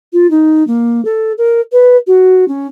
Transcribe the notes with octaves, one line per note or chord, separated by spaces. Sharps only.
F4
D#4
A#3
A4
A#4
B4
F#4
C#4